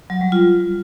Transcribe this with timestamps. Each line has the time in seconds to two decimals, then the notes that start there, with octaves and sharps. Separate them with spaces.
0.10 F#3
0.21 G3
0.32 F4